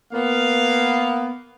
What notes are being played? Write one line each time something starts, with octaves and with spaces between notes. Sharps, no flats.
A#3 B3 F5